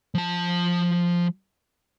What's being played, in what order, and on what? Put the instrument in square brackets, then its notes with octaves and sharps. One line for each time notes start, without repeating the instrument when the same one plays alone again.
[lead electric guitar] F3 A5